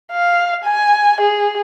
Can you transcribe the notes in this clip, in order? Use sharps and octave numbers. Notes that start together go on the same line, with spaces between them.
F5
G#5
G#4